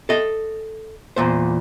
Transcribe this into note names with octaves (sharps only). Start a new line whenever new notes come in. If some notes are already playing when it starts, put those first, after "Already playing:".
A4 D#5
E2 A#2 C5